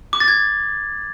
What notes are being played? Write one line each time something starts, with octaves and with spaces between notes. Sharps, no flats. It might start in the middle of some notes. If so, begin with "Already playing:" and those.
D6
A6
G#6